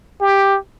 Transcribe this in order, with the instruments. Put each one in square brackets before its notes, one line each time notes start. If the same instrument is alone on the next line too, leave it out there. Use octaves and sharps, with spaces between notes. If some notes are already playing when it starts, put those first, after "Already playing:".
[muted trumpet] G4